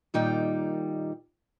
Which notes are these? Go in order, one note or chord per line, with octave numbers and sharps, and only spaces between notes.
A#2 D#3 G3 D#4 G5